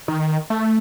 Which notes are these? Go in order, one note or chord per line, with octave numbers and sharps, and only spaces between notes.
D#3
A3